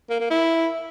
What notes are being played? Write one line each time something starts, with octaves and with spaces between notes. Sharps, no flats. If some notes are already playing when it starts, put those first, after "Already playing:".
A#3
A#3
E4